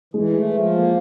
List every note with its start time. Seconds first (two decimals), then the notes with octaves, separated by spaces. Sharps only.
0.14 E3 G#3
0.33 A3
0.54 F3
0.73 A#3